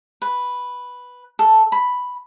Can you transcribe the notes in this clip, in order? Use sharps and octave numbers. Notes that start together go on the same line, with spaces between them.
B4
A4
B5